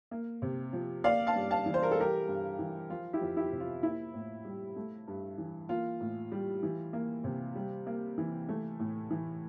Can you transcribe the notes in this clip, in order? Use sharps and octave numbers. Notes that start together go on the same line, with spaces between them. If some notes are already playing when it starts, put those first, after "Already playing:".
A#3
C3
F3
A#3 D5 F5
F5 A5
G2
F5 A5
E3
C5
A#4
A4
G3 G4 A#4
G2
E3
F3 F4
E4 G4
F2
E4 G4
C3
F4
A#3 E4
A2
G3
A3
G2
E3
A#3 F4
A2
G3
E3
A#3
C3
G3
A#3
E3
A3
A2
E3